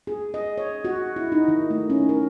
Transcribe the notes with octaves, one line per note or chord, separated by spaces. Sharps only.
G#4
D#5
C#5
F#4
E4
D#4
D#3
A3
C#4
A#4